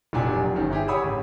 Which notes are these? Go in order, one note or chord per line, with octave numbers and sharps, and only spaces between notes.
F1 A#2 F#3 D4 G4 G#5
G1 D#3 C#4
E4 G4 G#4
G4 C#5 F#5 B5 D#6 E6
A1